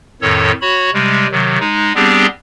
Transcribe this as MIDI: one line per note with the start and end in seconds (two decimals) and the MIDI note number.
0.22 0.52 41
0.22 0.52 45
0.22 0.52 51
0.22 0.52 69
0.22 0.52 73
0.61 0.90 66
0.61 0.90 73
0.61 0.90 83
0.94 1.27 48
0.94 1.27 55
0.94 1.27 56
1.31 1.58 48
1.31 1.58 51
1.31 1.58 54
1.60 1.92 56
1.60 1.92 63
1.95 2.27 55
1.95 2.27 59
1.95 2.27 60
1.95 2.27 62
1.95 2.27 67
1.95 2.27 68